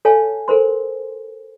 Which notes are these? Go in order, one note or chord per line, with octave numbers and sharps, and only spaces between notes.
A4 C#5 F5 G#5 A5
A4 A#4 C5 C6